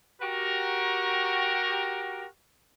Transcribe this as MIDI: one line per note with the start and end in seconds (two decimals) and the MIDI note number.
0.22 2.26 66
0.22 2.26 67
0.22 2.26 70